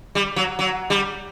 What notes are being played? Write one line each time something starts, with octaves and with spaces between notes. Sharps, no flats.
G3
F#3
F#3
G3